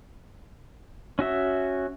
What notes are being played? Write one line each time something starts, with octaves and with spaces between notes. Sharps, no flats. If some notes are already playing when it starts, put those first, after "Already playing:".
C#4 F#4 E5